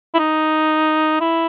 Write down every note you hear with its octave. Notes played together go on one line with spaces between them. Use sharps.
E4
D#4
E4